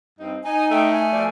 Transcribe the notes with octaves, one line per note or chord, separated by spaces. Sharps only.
G2 C4 D#4
D#4 G#5
A3 G5
G#5
B2 F3 D5